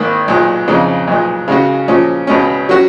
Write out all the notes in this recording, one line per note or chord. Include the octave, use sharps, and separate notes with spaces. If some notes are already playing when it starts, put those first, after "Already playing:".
Already playing: G#1 G#2 D#3 A#3
B1 A#2 G#3
F2 C#3 G#3 D#4
B1 A#2 G#3
C#3 G#3 C#4 F#4
A#2 F3 G#3 C#4
C#2 B2 G#3 C#4
F#3 C#4 F#4